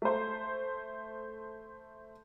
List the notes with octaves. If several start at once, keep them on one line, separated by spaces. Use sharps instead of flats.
A3 C5